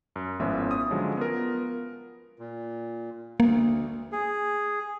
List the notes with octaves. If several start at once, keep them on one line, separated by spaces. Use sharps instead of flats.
F#2
G#1 A2 F3 B3 C#4 E5
D#6
D3 F3 F#3 G#3 C#4
B3 F4 A#4
A#2
D2 A#3
G#4